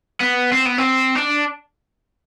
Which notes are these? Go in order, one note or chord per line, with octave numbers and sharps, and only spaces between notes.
B3
C4
B3
C4
D4